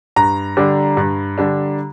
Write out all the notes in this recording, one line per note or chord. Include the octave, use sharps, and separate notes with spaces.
G2 A#5
D3 G3 D4
G2
D3 G3 D4